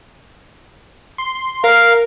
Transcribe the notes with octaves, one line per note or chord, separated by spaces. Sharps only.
C6
A#4 F5